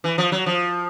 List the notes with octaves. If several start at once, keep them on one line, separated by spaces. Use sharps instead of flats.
E3
F3
F#3
F3